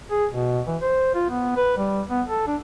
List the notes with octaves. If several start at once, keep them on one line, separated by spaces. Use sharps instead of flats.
G#4
B2
E3
C5
F4
B3
B4
G3
B3
A4
D4